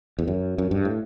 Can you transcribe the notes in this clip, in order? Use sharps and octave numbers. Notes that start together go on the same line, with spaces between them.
E2
F#2
F#2
G2
A2